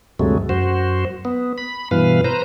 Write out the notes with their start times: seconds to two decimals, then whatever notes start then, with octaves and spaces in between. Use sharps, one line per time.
0.19 D2 G2 C3 F#3 G#3 A3
0.49 F#2 F#4 C5
1.25 B3
1.58 B5
1.91 G2 B2 E3 B4 F5
2.24 B4 C5 A#5